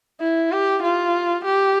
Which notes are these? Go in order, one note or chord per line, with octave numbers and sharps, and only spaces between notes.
E4
G4
F4
G4